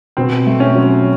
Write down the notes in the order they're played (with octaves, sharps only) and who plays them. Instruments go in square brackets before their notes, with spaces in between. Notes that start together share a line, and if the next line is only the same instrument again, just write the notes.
[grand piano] B2 [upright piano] C4
[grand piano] A3
[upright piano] C#4
[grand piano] F#3